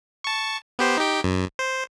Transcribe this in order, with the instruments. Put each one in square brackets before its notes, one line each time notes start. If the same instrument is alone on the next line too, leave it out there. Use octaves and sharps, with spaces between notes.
[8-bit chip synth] A5 C#6
B3 G4 C5
D#4 G4 G5
F#2
C5